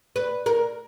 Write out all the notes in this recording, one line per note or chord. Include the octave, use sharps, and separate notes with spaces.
B4
A#4